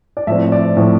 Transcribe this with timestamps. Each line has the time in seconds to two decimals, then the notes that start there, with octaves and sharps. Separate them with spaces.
0.17 D5
0.27 A2 F3 C4 E5
0.52 D5
0.77 A2 F3 C4